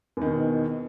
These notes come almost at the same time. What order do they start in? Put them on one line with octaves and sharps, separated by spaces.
E2 D#3 B2